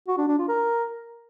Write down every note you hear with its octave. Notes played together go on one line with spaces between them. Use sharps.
F#4
D4
D4
F4
A#4